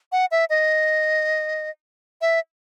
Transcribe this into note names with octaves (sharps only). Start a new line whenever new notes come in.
F#5
E5
D#5
E5